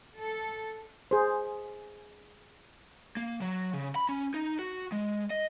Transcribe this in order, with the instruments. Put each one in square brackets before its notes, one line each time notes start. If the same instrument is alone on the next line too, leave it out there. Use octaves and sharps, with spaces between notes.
[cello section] A4
[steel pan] G#4 C5
[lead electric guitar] A#3
F#3
C#3
B5
C#4
D#4
F#4
G#3
D#5